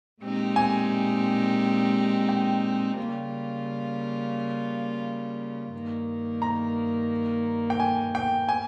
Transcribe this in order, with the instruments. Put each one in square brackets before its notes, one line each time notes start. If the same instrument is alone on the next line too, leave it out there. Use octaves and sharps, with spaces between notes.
[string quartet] A#2 G#3 C4 D#4 G4
[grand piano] G#5
G5
[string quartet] C#3 G3 A#3 F4
G2 D#3 A#3
[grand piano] A#5
G5
G#5
G5
G#5